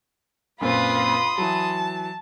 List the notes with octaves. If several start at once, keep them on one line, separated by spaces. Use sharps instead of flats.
F#2 A#2 C4 F4 B4 B5 C6 D#6
E3 F#3 A5